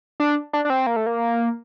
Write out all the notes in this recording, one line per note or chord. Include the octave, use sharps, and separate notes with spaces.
D4
D4
D4
C4
A#3
A3
A#3